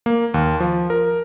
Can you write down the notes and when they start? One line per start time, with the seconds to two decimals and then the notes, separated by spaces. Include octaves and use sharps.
0.06 A#3
0.34 D#2
0.60 F3
0.90 A#4